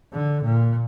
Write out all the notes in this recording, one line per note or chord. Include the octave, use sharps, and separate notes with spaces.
D3
A#2